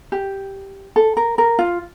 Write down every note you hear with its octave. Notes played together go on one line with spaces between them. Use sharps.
G4
A4
A#4
A#4
F4